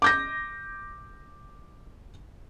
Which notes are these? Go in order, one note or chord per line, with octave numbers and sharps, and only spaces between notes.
D6 G6 A#6